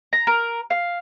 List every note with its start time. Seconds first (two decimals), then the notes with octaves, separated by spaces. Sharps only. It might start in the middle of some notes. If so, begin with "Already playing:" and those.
0.13 A#5
0.27 A#4
0.70 F5